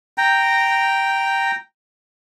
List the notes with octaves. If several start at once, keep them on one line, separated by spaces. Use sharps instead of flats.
G5 A#5